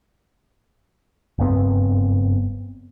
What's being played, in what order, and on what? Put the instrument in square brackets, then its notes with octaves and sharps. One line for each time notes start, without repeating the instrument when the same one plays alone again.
[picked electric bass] F#1 G2 B3 C4